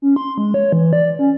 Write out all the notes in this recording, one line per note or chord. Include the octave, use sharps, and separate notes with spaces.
C#4
C6
G#3
C#5
E3
D5
C#4